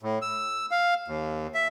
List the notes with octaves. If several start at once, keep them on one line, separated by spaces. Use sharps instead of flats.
A2
E6
F5
D#2
E5